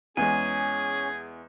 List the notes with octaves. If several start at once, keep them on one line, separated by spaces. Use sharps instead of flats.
E2 G#3 C#4 G#4 G#5